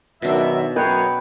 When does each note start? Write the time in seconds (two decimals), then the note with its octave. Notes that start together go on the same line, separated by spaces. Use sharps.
0.22 F#2 B2 D#3 D4 E5
0.76 F#2 G#4 B4 C#5 G5